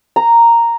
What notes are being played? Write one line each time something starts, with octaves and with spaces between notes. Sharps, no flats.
A#5